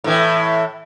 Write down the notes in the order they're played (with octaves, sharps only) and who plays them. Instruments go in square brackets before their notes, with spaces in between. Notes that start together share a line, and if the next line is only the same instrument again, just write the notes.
[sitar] A2 E3